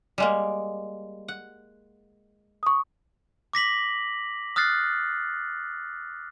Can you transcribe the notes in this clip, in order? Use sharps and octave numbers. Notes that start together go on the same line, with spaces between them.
G3 G#3 A#3
F#5
C#6 D#6
D6 A#6 B6 F#7
D#6 F6 F#6 A6 C7